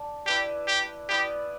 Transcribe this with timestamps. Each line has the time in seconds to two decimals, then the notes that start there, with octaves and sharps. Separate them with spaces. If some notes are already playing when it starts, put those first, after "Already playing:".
Already playing: D4 D5
0.26 E4 G4 B4 D5
0.67 G4
1.09 B3 E4 G4 B4 D5